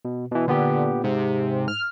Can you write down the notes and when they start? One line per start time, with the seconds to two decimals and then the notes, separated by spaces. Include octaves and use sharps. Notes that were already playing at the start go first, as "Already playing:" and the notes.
0.05 B2
0.32 B2 E3
0.47 A#2 D3 B3 G4
1.04 G#2 C3
1.68 F6